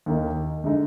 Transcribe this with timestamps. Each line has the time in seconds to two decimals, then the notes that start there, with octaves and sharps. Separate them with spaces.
0.06 D#2 D#3 A#3 D#4
0.64 D3 G#3 D#4